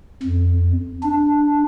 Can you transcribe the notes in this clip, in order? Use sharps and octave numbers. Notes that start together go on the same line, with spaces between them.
F2
D4